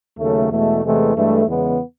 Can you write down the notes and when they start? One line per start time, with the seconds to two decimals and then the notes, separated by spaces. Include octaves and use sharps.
0.18 D#2 C#3 F#3 A3
0.50 E2 B2 G#3 A3
0.82 E2 C3 E3 G#3 A3
1.15 G2 E3 G#3 A3
1.47 E2 C#3 E3 G#3 B3